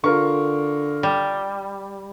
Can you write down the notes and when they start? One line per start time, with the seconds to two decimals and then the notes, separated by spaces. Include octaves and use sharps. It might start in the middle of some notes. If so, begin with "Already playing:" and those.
0.04 D3 F4 A#4 C#6
1.03 G3